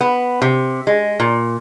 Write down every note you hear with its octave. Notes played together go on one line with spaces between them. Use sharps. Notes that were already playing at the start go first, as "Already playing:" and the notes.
B3
C3
G#3
A#2